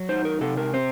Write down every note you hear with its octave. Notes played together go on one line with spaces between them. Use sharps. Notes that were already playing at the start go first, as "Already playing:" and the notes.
Already playing: F#3
D#4 C5
A#4
C3 A4
A#4
C4 C5